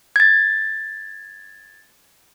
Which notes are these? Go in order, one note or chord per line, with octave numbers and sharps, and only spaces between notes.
G#6 A6